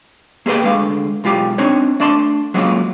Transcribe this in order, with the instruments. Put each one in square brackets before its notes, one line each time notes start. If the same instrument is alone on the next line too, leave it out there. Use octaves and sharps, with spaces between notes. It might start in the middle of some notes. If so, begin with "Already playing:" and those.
[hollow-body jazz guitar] A#3 G4 G#4 B4 G5
D2 D3 G#3 F5
B1 G#3 F4 G4
C4 D4 D#4 C#5
A3 D4 D5 A5 C6
F#3 G#3 A#3 B3 C#4 F4